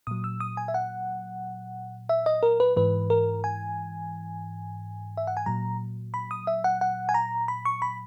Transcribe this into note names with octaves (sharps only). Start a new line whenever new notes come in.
A#2 F#3 D#6
E6
D#6
G#5
E5
F#5
E5
D#5
A#4
B4
G#2 E3 B4
A#4
G#5
E5
F#5
G#5
A#2 F#3 A#5
B5
D#6
E5
F#5
F#5
G#5
A#5
B5
C#6
B5